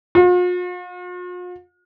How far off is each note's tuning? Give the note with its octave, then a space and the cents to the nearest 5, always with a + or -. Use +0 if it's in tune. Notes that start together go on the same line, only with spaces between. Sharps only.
F4 +45